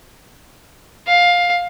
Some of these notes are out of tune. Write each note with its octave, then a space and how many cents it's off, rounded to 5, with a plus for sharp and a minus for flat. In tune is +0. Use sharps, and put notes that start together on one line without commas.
F5 +15